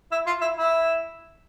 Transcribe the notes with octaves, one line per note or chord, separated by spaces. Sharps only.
E4
F4
E4
E4